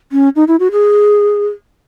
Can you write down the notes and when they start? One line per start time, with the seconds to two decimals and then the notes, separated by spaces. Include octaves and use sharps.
0.12 C#4
0.36 D#4
0.48 E4
0.60 F#4
0.72 G#4